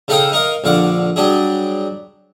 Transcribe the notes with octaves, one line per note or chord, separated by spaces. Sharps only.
C#3 D#4 A4 F5 G5 D#6
D#4 A#4 D#5 F5
A#1 D3 F5 F#5 D6
F#3 G3 D4 G#4